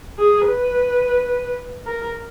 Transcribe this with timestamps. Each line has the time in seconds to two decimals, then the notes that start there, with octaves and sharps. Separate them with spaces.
0.19 G#4
0.46 B4
1.86 A#4